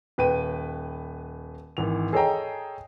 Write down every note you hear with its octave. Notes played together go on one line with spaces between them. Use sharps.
D#1 B4 G5 D#7
G#1 E3 F7
G#4 A4 C#5 D#5 G5 A#5